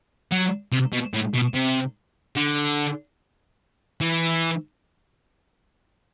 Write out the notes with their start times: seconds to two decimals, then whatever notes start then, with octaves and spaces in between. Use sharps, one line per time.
0.32 F#3
0.72 C3
0.93 B2
1.14 A2
1.34 B2
1.54 C3
2.36 D3
4.01 E3